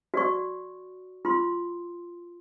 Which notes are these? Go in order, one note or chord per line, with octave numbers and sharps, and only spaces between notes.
F#4 D5 C#6
F4 C6